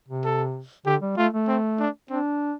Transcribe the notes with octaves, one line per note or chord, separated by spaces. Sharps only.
C3
A4
D3 G4
G3
A3 F4
A3
C4
D4
C4 D4